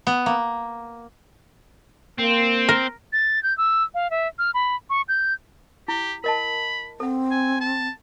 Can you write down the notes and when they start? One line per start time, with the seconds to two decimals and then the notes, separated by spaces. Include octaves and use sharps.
0.07 B3
0.26 A#3
2.19 A#3 C4
2.69 A#4
3.13 A6
3.43 G6
3.58 E6
3.94 F5
4.10 E5
4.39 F6
4.54 B5
4.90 C#6
5.08 G6
5.88 E4 G4
6.24 A#4 D#5 A5 B5
7.00 C4 A4 F#5
7.31 G#5
7.61 A5